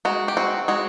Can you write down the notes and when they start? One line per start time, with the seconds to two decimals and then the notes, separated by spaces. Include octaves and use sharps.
0.05 G#3 F#4
0.28 G4
0.37 C4 F#4
0.68 G#3 F#4